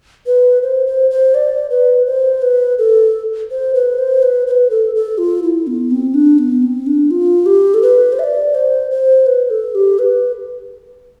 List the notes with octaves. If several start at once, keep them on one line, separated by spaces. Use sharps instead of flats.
B4
C5
C5
C5
D5
B4
C5
B4
A4
C5
B4
C5
B4
C5
B4
A4
A4
F4
E4
B3
C4
D4
B3
C4
D4
F4
G4
A4
B4
C5
E5
D5
C5
C5
B4
A4
G4
B4